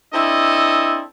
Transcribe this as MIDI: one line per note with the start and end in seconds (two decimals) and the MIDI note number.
0.13 1.01 60
0.13 1.01 62
0.13 1.01 64
0.13 1.01 69
0.13 1.01 75